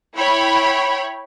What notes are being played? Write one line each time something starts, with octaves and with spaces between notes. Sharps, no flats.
E4 C#5 G5 B5